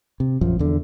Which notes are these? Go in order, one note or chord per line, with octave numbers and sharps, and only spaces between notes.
C3
A#1 F#2 F3
E2 D3